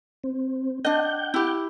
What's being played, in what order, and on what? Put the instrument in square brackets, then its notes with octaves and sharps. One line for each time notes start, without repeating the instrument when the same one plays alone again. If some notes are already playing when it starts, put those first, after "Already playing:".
[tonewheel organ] C4
[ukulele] D4 D#5 [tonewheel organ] F#5 G5 G6
[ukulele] E4 G4